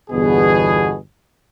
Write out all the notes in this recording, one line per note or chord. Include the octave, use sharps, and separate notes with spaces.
G1 E2 B2 B3 G#4